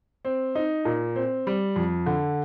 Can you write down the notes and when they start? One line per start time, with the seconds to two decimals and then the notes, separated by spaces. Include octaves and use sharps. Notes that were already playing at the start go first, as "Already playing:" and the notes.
0.25 C4
0.55 D#4
0.85 A#2
1.16 C4
1.47 G3
1.76 F2
2.06 D3